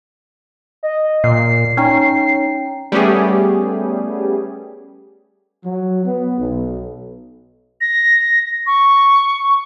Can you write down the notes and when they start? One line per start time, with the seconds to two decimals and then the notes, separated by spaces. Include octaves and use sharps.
0.83 D#5
1.24 A#2 C7
1.77 C#4 D#4 G5 A#5
2.92 G3 A3 B3 C#4 G4 G#4
5.63 F#3
6.04 B3
6.38 B1
7.81 A#6
8.67 C#6